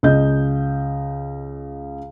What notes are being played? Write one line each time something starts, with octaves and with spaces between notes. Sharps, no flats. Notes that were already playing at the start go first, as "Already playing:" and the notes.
C#2 D#5 G6